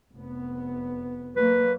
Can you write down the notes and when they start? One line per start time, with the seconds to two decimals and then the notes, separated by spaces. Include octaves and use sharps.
0.14 F1 B3
1.36 F#3 A#3 B4